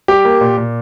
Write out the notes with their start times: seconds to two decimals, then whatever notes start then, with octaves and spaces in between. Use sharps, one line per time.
0.08 G3 G4
0.25 A#3
0.41 A#2
0.57 A#2